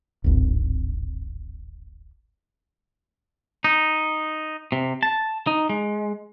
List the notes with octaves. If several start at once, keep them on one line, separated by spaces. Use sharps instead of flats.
D1 G#1
D#4
C3
A5
D#4
G#3